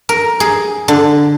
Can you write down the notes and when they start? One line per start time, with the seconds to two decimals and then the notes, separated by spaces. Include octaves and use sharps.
0.09 A#4
0.40 G#4
0.88 D3